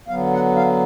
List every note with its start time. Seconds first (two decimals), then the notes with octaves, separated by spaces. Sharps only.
0.08 D3 F#3 B3 F5
0.33 F#5
0.56 F5